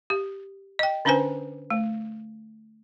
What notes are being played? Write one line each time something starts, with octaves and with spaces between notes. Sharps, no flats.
G4
D#5 G5
D3 C#4 D4 B4 C5 G#5
A3